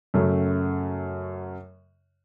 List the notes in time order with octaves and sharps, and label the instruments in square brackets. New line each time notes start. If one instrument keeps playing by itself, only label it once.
[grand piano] F#2 C#3 F#3 A3